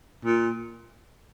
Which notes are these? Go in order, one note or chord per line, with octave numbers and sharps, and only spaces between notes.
A#2